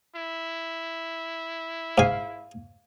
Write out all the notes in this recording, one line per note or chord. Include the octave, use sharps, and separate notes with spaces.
E4
G#2 F5 G#5